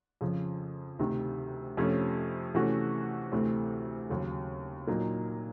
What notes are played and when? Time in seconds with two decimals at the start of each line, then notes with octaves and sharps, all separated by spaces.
0.21 F2 C#3 F3
0.99 D2 C3 D#3
1.77 F2 C3 F3 A3 C#4
2.55 C3 E3 A3 C#4 F#4
3.32 D2 C3 E3 A3 C4
4.10 D#2 C#3 F#3
4.87 A#2 F#3 A#3 D#4